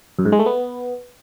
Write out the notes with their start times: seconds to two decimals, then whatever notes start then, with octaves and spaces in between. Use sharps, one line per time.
0.19 F#2
0.25 G#2
0.32 G#3
0.39 A3
0.46 B3